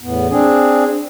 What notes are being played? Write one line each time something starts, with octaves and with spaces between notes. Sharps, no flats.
E2 A2 B3
C4 D4 G#4